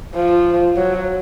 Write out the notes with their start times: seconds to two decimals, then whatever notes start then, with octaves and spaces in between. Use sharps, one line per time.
0.15 F3
0.76 F#3